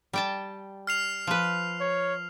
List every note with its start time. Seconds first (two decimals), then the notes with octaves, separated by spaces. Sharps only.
0.13 G3 G5 A5
0.87 F6 C7 F7
1.27 F3 B4
1.81 C#5